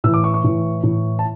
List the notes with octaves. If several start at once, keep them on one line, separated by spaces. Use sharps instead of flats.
A2 E3 E6
D6
C#6
C#6
A2 E3
A2 E3
A5